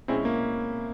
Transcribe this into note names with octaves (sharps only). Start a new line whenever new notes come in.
B2 G#3 C4 C#4 E4 G#4
A#3